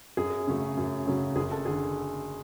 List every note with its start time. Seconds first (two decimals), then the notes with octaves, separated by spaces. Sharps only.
0.17 F#2 G#4
0.47 C#3 F#3 A3
0.77 F#2
1.06 C#3 F#3 A3
1.36 F#1 G#4
1.51 A4
1.65 D3 G#4